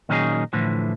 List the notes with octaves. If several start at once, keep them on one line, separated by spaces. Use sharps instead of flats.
A#2 D#3 F#3 C#4 D#4 G#4
A2 D3 E3 F3